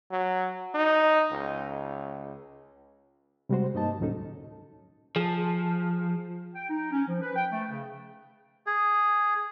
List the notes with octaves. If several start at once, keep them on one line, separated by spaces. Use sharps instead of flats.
F#3
D#4
C#2
C3 G3 G#3 F#4 C5
G2 A#3 D#4 D#5 A5
D2 A2 F#3 C#4 D#4 A4
F3 G#4 A5
G5
D#4
C#4
F3
B4
G5
A3
C#3
G#4